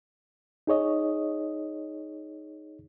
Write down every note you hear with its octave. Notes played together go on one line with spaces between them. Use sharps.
D#4 G#4 C#5 D#5